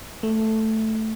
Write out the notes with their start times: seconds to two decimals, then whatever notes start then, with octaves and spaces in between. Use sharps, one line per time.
0.23 A3